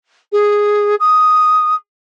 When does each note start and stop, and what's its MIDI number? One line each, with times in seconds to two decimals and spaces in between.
0.32 0.95 68
1.00 1.74 87